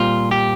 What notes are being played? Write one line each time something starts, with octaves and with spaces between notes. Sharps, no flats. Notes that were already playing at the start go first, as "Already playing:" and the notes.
Already playing: A#2 G3 C4 F4
G4